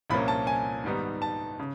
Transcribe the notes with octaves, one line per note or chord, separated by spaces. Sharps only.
C2 A#2 F3 A#3 C#4 B5
A5
G#5
G#2 D#3 G3 B3 D#4
A5
C#3